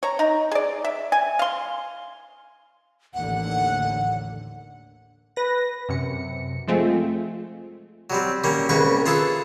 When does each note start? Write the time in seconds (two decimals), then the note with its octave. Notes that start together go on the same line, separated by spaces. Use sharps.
0.03 C#5 A#5
0.19 D#4 A#5
0.52 G#4 D5
0.84 E5
1.12 G#5
1.39 F5 C6
3.14 A1 D#2 D3 F#5
5.36 B4 A#6
5.89 F#2 C3 C#7
6.68 F3 G#3 A3 C4 F4 G#4
8.10 F#3 G3 C4
8.44 G3 A#3 C#4
8.69 C2 C#3 A#3 B4 C#6
9.06 F4 G#4 A4 B4